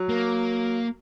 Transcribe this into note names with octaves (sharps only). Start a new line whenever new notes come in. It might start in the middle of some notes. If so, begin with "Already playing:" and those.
Already playing: F#3
A#3